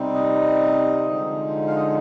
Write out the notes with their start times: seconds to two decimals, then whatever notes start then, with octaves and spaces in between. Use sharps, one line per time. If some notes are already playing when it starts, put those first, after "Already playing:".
Already playing: C3 G3 C4 D#4
0.14 D#5
1.06 D3 F3 G#3 D#4
1.67 F5
1.76 D#5